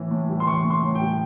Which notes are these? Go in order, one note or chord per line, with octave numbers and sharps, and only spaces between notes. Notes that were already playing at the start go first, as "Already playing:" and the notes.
Already playing: A2 E3
A2
G3
C6
E3 C#6
A2
C6
A2
G5
G3